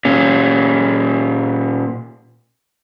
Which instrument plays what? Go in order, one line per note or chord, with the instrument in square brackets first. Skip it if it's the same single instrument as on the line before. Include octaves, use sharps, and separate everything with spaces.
[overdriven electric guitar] A#2 C#4